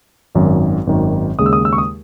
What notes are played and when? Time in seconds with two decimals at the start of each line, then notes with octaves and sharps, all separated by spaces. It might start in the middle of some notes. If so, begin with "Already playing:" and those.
0.35 G#1 F#2 D#3
0.87 G#1 F#2 D#3
1.39 D#2 C#3 G#3 D#6
1.46 E6
1.53 D#6
1.65 E6
1.73 C#6
1.78 D#6